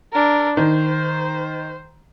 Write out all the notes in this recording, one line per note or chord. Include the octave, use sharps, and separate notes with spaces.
D4 A#4
D#3 C5